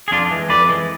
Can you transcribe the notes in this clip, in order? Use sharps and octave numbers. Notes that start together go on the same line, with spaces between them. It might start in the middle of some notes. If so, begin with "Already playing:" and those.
G#4
F2 D4 F4
E3 G#3
F2 B4 D5
E3 G#3